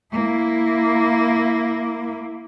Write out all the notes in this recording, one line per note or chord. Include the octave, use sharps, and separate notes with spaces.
A#3 E4